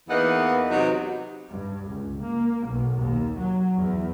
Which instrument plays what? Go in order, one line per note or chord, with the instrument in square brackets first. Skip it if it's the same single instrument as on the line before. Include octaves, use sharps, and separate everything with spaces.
[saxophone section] E2 E3 A#3 B3 D#4 F#5
C3 F#3 B3 D#4
[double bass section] G2
C#2
A#3
B1
D#2
F#3
E2